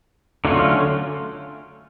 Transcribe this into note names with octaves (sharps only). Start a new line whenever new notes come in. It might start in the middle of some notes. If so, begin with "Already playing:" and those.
D3 F#3 A3 C#4 F4